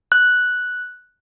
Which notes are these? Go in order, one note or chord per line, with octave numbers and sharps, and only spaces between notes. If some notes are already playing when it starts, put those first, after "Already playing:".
F#6